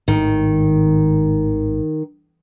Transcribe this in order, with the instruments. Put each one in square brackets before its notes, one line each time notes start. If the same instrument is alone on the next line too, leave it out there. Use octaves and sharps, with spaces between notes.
[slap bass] G#1 A2 [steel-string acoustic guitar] D#3